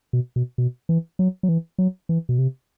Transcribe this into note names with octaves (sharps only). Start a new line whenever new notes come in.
B2
B2
B2
E3
F#3
F#3
E3
F#3
E3
B2
C3